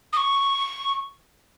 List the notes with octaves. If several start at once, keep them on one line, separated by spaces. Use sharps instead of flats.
D#6
C#6